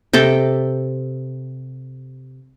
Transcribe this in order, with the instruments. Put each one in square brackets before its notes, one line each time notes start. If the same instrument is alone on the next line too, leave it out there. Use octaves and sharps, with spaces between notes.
[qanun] C3 A4 G5